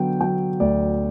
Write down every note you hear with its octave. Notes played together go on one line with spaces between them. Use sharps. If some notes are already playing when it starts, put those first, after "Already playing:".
Already playing: D3 F#3 B3 G5
F#3 G5
D2 D5